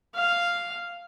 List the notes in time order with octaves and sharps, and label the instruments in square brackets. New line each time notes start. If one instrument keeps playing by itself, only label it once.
[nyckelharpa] F5